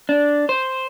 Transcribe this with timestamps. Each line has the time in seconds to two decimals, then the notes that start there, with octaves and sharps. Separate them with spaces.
0.09 D4
0.49 C5